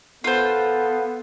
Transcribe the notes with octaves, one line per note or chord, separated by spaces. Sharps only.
B3 F4 A4 C5